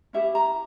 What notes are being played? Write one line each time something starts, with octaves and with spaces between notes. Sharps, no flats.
C#4 E4 G4 E5
A#5